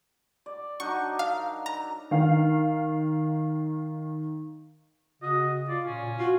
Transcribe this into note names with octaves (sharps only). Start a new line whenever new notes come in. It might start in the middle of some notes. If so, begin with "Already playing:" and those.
D5
F#3 D4 D#4 C#6
A#4 F5
A#5
D#3 F5
C#3 F#4 D#5
F4 D5
A#2 C#4
F4 F#4